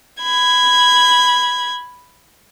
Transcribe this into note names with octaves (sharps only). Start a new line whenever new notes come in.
B5 G#6